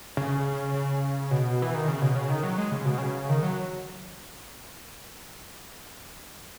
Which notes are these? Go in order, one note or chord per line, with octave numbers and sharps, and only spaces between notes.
C#3
C#3
B2
E3
D#3
C#3
B2
C#3
D#3
F#3
G#3
C#3
B2
C#3
D#3
F#3